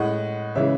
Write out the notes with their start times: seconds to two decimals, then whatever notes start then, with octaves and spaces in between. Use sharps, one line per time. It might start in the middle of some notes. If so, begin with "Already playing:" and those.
Already playing: A2 G#3 D#5 F#5
0.55 C#3 E3 G#3 C#5 E5